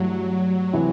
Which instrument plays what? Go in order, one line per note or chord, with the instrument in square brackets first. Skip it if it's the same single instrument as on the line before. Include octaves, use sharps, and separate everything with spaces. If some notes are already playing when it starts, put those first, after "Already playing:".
Already playing: [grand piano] G2 E3 A3 [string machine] F#3
[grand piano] C3 E3